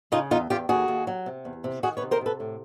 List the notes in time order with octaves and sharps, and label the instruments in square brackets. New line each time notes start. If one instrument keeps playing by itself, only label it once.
[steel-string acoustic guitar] C#3 D#4 F4
E2 D#4 F4
E2 F4 G4
D#2 F#4 G#4
D#2
F#3
C3
E2
C3
D#3 F#4 G#4
B4 C#5
C3
A#4 C5
C3 A4 B4
A2